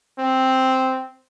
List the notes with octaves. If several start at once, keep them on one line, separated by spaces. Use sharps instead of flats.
C4